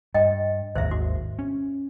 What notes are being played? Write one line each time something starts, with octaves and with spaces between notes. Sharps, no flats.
G2 D#5 G5
G#1 D#2 C5 E5
F#4
C#4